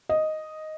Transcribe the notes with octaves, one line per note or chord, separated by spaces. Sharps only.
D#5